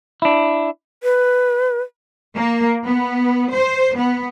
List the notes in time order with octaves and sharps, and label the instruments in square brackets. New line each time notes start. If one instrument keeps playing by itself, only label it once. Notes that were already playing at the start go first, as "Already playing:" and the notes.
[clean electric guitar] D4 E4
[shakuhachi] B4
[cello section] A#3
B3
C5
B3